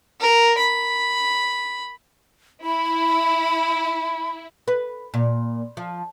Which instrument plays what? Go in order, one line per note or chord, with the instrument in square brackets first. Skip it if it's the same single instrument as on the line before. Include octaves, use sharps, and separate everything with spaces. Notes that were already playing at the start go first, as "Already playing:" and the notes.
[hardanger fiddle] A#4
B5
[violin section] E4 [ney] B5
[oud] B4
A#2
F3